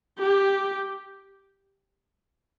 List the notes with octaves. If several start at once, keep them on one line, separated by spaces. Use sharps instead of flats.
G4